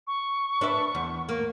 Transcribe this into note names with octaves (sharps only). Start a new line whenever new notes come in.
C#6
D4 B4 E5
E2
A#3